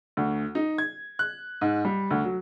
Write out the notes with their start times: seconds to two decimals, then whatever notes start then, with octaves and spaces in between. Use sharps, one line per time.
0.17 D2
0.55 D#4
0.78 G#6
1.19 F#6
1.61 G#2
1.85 G3
2.10 D2
2.24 F#3